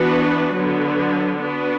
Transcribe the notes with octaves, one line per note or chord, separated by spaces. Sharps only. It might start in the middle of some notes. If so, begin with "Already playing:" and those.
Already playing: E3 B3 D4 F#4 B4
D3 F#3 B3
B3 D4 F#4 B4